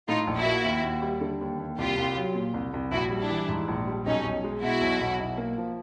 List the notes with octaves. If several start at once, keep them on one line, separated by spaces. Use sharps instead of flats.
A2 D#4 F4
A#1
E4 F#4
A#3
D#2
D#2
G3
D3
D#2
D#2
C2 F4 G4
C2
F#3
A#2
C2
C2
A#1 E4 F#4
G3
D4 E4
E3
G#2
A#1
G3
B1 C#4 D#4
B1
G#3
B2 E4 F#4
B1
B1
B1
A#3
F3